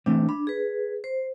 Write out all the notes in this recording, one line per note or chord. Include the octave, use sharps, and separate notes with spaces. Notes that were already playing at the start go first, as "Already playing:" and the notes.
E3 A3 C4 D4
D4 B5
G#4 B4
C5